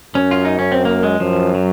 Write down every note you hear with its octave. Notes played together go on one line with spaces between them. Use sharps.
F#2 C#4
F4
D#4
C#4
C4
A#3
G#3
F#2 F3
F#3